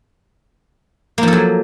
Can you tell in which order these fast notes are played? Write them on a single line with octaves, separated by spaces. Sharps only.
A#3 F3 A4 F#3